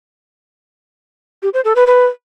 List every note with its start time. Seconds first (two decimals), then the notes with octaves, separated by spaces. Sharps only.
1.43 G4
1.54 C5
1.65 A4
1.76 B4
1.87 B4